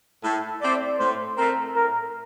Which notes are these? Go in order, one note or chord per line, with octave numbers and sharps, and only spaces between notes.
A2 A4
A3 C4 D5
A2 C5
A3 C4 A#4
A2 A#4